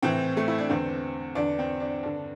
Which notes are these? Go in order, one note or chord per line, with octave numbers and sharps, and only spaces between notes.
A2 E3 C4
A3
E4
D4
E2 D3 C4
E2 D3 D4
C4
D4
G2 D3 D4